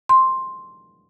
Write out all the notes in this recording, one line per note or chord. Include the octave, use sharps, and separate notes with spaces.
C6